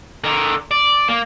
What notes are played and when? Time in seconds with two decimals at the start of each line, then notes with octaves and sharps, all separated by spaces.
0.24 D3 A#4
0.71 D5
1.08 A#3